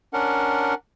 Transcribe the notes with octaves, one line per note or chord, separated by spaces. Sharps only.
C#4 D4 A#4 F#5